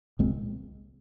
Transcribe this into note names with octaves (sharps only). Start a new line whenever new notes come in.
C2 A#2 G#3 C4